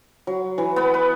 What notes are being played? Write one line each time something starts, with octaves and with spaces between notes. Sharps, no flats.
F#3
E3
B3
B4